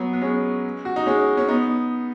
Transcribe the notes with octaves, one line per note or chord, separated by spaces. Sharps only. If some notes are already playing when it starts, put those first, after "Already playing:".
Already playing: F#3 B3
B3
G#3 C#4
F#4
D#4
G#3 C#4
C#4
B3 D#4